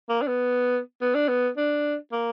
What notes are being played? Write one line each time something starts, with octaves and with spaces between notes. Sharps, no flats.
A#3
D4
B3
B3
D4
B3
D4
A#3